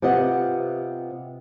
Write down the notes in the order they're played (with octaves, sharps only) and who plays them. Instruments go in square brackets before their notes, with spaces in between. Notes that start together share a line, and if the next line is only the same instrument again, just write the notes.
[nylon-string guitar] C3 B3 F4 D#5 F#5